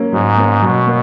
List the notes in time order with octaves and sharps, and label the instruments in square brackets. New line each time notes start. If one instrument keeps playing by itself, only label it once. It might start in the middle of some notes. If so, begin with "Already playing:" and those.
Already playing: [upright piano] F#3 A#3 C#4
[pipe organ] G#2 [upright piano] F#3
[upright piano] A#3 C#4
[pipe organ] B2 [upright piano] F#3
[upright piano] A#3